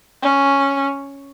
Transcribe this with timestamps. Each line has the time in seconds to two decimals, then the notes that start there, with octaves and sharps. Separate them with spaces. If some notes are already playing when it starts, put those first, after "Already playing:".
0.22 C#4